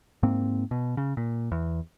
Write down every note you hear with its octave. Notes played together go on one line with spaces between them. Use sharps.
G#2 A#3 C4
B2
C#3
A#2
E2